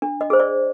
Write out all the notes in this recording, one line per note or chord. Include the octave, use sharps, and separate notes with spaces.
D4
D#5
G#4 C5
D5